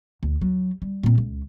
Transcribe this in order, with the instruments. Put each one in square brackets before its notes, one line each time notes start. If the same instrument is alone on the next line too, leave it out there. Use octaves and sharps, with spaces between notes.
[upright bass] D2
F#3
G3
A#2 C4
C#2